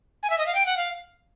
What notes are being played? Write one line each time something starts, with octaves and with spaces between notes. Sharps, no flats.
G#5
E5
D#5
F5
G5
F#5
F5